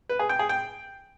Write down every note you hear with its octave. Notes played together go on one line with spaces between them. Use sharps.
B4
G#4
G5
G#4
G5